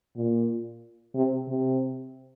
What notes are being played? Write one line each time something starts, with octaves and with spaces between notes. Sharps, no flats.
A#2
C3
C3